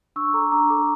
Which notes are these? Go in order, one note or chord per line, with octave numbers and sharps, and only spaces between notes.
D4 C#6 E6
A4 A#5 D6
D4 A#5 D6
A4 A#5 D6